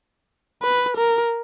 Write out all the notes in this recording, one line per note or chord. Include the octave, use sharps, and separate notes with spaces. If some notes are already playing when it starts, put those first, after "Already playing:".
B4
A#4